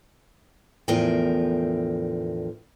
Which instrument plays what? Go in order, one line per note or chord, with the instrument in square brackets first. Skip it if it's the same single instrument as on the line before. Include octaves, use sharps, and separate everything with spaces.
[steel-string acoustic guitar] E2 A2 D3 F3 A#4 G5